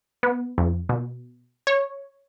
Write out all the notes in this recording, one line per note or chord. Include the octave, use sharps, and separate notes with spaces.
B3
F2
B2
C#5